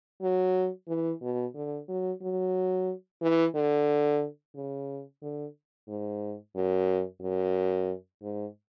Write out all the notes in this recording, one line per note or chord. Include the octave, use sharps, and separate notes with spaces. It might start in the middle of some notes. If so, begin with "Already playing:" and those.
F#3
E3
B2
D3
F#3
F#3
E3
D3
C#3
D3
G#2
F#2
F#2
G#2